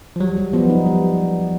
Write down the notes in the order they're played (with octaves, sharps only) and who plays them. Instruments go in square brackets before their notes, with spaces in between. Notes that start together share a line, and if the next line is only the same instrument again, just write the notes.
[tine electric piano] F3
[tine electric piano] F#3 [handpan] G3
[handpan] G3
[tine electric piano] F3 [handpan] B3
[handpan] D#4
G3